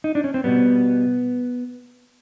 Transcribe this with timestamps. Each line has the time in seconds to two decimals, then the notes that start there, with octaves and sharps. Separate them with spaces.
0.04 D#4
0.15 D4
0.24 C#4
0.34 C4
0.44 B2 G3 B3